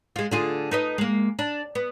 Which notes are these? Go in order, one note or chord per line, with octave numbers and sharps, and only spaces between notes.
G#3 F4
D3 F4 G#4
D#4 B4 D#5
G#3 A#3
D4
B3